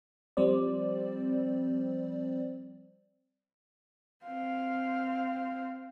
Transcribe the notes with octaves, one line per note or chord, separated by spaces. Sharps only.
F3 G3 C4 C5 D5
C4 F5